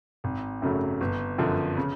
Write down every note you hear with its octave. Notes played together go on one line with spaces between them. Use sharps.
G#1
F#2 C#3 F#3 A3
G1
F#2 D3 F3
C#3